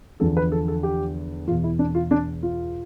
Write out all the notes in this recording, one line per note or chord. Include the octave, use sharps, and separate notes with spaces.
E2 D3 F3 A4
B4
A4
A4
G4
E2 B2 F4
E4
D4
F4
D4
F4